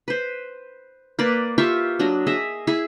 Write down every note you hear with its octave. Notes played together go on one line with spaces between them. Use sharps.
B4 C5
A#3 B4 D5
F4 G4 E5 C#6
F#3 D4 D#5
G#4 D#5 E5
E4 G#4